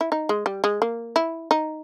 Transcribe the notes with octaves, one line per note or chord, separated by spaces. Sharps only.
E4
D#4
G#3
G3
G#3
A#3
E4
D#4